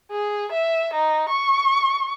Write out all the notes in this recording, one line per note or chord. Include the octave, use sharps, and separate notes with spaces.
G#4
E5
D#4
C#6